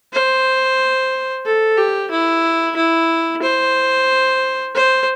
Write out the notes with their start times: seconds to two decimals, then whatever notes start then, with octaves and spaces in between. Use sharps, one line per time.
0.13 C5
1.45 A4
1.77 G4
2.11 E4
2.76 E4
3.43 C5
4.75 C5